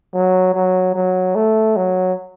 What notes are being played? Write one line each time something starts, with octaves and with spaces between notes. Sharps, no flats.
F#3
F#3
F#3
A3
F#3